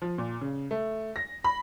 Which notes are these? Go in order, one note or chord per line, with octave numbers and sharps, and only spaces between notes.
F3
A#2
C#3
A3
A#6
B5